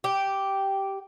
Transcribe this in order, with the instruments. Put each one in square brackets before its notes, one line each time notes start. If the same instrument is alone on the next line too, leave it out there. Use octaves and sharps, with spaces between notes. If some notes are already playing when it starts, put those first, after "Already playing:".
[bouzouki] G4